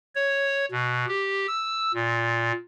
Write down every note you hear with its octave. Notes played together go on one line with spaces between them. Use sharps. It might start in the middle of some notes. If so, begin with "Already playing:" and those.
C#5
B2
G4
E6
A#2